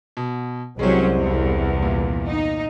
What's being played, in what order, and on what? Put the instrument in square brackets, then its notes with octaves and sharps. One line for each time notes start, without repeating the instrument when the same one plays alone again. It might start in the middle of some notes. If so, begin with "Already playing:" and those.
[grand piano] B2
[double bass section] C2 [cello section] F#3 C#4 [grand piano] G#3 C4
[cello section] E2
[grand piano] A#2
[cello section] D#4